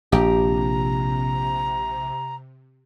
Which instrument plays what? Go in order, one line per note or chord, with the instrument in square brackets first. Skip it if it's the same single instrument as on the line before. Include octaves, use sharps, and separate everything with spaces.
[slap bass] A#1 [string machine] C3 [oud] G4 [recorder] A#5